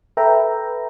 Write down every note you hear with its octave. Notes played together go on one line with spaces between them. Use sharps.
A4 B4 E5 G5 A#5